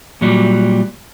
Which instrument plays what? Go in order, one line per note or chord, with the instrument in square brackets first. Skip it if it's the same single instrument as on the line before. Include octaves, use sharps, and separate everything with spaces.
[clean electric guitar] A#2 F#3 G3